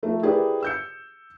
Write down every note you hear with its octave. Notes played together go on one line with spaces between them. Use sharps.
F3 A3 A#4
E4 G4 G#4 A#4 B4 D5
E6 G6 C#7